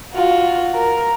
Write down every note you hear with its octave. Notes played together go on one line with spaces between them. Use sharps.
F4 F#4
A#4